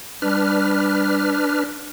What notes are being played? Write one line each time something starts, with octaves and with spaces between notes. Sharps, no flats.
G3 D4 B4 F6